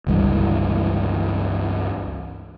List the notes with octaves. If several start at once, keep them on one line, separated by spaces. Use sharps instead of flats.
G1 C#2 G2 E3